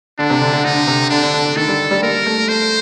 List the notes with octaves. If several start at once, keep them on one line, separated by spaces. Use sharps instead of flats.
D3 D4
C3
D3
D3
D3 D#4
C3
D3 D4
D3
D3
D3
D#3 A4
G3
G3
A#3 A#4
A3
A3 C5